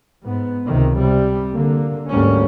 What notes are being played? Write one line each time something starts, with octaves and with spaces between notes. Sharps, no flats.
G#2 B3
C#2 C3 D#3
C3 G3
D3 A#3
D2 G#2 D3 G3 A#3 C#4